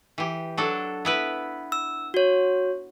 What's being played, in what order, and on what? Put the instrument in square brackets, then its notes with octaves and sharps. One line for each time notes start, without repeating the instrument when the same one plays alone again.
[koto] E3 G4
F#3 D4 A4
B3 E4 B4
[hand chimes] E6
F#4 C#5